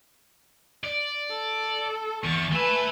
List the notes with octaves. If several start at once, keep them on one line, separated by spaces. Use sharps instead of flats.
D5
A4
E2 C#6 A6
A3 B4 E5 G#5